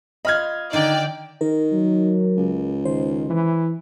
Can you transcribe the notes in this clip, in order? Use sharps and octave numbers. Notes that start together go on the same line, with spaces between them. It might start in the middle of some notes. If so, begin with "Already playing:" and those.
F4 D#5 B5 F6 G#6
D3 D#3 D#4 D5 G5
D#3 A#4
F#3
C#2
D#3 C5
E3